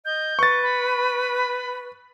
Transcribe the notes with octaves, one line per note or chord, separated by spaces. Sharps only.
D#5 G6
B4 C#6 A6
B5